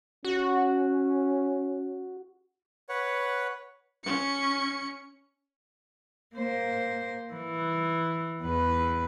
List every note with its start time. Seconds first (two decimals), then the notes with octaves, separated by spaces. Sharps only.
0.25 C#4 F#4
2.89 B4 C#5 F#5
4.04 C#4 C#7
6.36 A#3 C5
7.34 E3
8.42 E2 B4